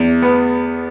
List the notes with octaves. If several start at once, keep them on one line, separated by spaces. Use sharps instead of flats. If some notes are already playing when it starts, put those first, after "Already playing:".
Already playing: E2
B3